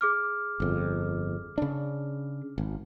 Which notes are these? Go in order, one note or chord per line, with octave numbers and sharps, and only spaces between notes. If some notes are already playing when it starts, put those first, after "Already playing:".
G#4 D6 F6
G1 F2
C#3 D4
G#1